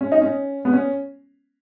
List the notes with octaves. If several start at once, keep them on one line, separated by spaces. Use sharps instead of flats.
C#4
D#4
C#4
B3
C#4